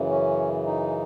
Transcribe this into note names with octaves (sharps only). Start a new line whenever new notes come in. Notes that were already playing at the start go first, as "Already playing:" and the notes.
Already playing: F#2 C#3 E3
C#4
D#4